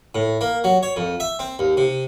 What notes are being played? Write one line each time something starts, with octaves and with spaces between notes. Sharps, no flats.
A2
A#3
F#3
C#5
F2
E5
C4
D#2
C3